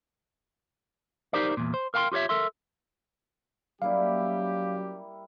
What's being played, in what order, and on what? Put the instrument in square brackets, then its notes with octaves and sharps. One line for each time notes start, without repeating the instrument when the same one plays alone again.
[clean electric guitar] D#4 G4 A#4 C5 D5
E2 A#2
C5
A#4 F5 G5 A#5 C6
F4 G4 A#4 C#5 E5
A4 A#4 E5 C6
[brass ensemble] F#3 C#4 G4 [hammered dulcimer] G3 A#3 E4 [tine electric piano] F5